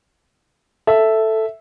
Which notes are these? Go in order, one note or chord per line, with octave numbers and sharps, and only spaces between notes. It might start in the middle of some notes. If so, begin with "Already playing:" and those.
A4 E5